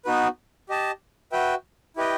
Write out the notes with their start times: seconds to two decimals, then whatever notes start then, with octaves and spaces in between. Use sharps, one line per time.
0.05 B3 D#4 F#4 B4
0.69 G4 D#5 A5
1.32 F#4 B4 E5 G5
1.96 E4 G4 B4 D#5 G5